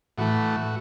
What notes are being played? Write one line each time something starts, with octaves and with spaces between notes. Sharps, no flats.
A2 E3 A3 F#4